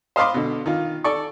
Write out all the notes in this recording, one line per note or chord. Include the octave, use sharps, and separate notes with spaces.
C5 D#5 F5 B5 C6 D6
B2 D3
D#3 F4
A4 D5 C#6